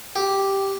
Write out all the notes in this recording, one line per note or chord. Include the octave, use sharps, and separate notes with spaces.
G4